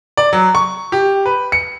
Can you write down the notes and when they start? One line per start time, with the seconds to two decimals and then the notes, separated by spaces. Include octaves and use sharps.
0.17 D5
0.33 F#3
0.55 C#6
0.92 G4
1.26 B4
1.52 C#7